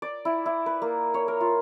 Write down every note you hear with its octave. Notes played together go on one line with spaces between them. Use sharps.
D5
E4
E4
B4
A#3
C#5
A#4
F4